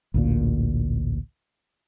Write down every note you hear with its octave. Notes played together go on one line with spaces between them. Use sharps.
A1 D2 A#2